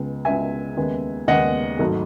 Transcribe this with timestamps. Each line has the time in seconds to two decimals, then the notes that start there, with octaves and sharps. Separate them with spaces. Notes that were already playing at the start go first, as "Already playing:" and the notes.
Already playing: C#2 C#3 G#3 B3
0.25 C#2 C#3 G#3 B3 E5 G#5
0.77 D#2 C#3 G#3 B3
1.28 D#2 C#3 G#3 B3 D#5 F#5
1.79 G#1 G#2 F#3 A3